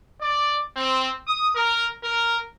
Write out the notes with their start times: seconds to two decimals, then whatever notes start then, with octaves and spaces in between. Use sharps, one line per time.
0.20 D5
0.77 C4
1.27 D#6
1.56 A#4
2.03 A#4